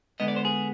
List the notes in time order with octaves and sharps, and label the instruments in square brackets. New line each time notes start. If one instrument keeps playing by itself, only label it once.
[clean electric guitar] D3 G#3 B3 D#5
D5
C5
G#4